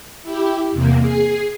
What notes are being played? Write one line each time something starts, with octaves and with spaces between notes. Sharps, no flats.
E4 G4
E2 C3 A#3
G#4 C7